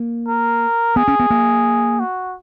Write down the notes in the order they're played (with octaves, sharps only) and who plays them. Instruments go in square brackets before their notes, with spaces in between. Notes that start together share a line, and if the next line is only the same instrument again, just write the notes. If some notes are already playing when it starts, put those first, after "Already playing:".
Already playing: [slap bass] A#3
[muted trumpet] A#4
[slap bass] B3 [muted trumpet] G#4
[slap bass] C#4
B3
A#3
[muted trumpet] F#4